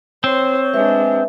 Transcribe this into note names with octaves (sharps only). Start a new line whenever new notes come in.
C4 C5 C#5
G#3 D4 B4 E5